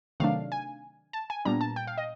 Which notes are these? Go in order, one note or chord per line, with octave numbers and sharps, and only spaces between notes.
C3 D#3 F#3 A3 D4 F5
G#5
A5
G#5
A#2 G3 B3 D4 A#5
A5
G5
F5
D#5